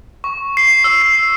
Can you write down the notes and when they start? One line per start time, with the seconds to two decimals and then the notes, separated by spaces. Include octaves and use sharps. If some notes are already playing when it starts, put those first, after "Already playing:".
0.24 C#6
0.57 C7
0.84 E6
1.01 C7